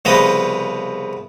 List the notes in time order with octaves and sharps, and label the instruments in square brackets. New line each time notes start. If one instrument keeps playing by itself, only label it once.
[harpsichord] C2 C#3 F3 B3 D#5 D#6